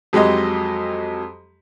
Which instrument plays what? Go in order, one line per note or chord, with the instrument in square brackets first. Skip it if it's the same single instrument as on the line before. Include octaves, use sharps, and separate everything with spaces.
[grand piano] F2 F#3 G#3 G4 D#5